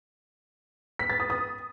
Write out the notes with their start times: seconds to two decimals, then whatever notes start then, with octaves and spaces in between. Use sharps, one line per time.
0.99 B6
1.10 A6
1.20 D#6
1.30 D#6